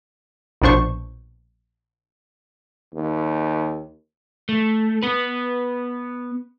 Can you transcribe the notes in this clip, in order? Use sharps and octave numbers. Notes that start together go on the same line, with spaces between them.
A#1 B2 D4 C5 C#6
D#2
A3
B3 B4